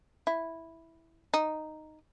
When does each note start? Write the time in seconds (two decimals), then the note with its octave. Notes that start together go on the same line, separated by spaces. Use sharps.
0.27 E4
1.34 D#4